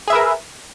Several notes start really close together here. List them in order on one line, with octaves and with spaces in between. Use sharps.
G#4 E5 B4 A#4